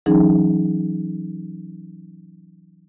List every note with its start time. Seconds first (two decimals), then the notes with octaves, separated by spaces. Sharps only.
0.06 E3 F#3 C#4 D#4 G#4